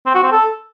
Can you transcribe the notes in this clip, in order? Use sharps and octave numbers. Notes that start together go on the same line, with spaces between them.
C4
F#4
C4
A4